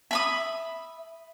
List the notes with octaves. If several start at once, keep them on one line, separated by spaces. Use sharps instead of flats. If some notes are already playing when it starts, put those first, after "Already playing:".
E5 B5 D#6